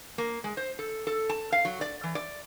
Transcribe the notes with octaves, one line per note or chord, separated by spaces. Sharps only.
A#3
G#3
C5
A4
A4
A5
F5
F#3
D5
E3
D5